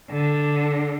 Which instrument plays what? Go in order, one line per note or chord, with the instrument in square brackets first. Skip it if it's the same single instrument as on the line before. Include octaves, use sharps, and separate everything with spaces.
[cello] D3